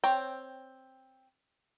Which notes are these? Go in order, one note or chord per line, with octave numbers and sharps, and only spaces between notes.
C4 C#5 G5